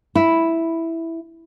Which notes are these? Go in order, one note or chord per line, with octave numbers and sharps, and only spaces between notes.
E4